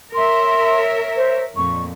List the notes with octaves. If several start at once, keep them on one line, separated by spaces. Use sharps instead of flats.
A#4 C#5 E5 C6
C5
F2 A#2 C#6